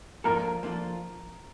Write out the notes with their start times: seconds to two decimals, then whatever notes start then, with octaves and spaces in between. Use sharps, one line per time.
0.24 F3 A#3 D4 F4 A4 A#4
0.63 F3 A#3 D4 F4 A4